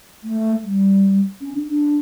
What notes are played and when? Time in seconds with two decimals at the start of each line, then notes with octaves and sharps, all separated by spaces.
0.24 A3
0.62 G3
1.41 C#4
1.54 D4
1.67 D4